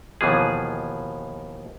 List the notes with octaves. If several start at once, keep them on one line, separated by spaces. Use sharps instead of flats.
D#2 B2 E3 F3 G#4